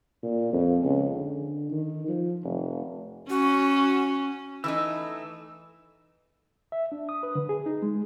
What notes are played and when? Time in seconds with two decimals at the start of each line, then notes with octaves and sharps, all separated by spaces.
0.23 A#2
0.53 F2
0.83 C#2
1.16 D3
1.71 D#3
2.08 F3
2.44 F1
3.30 C#4 F#4
4.64 E3 A3 D#4 E6
6.72 E5
6.92 D4
7.09 D#6
7.23 B4
7.35 D3
7.49 G#4
7.66 D#4
7.82 G#3